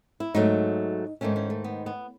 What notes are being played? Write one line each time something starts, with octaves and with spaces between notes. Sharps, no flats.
E4
G#2 F#3 A3 D#4
G#2 D#3 A3 C#4
C#4
A3
B3
B3